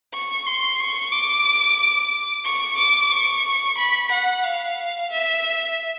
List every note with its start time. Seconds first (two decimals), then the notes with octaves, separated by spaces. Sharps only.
0.14 C#6
0.46 C6
0.80 C#6
1.12 D6
2.45 C#6
2.78 D6
3.12 C#6
3.78 B5
4.12 F#5
4.44 F5
5.11 E5